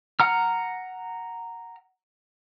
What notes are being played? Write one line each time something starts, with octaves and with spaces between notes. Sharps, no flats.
F#5 A#5 F6